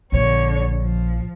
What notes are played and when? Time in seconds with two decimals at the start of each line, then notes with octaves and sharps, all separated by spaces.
0.12 A#1 D3 C#5
0.81 F3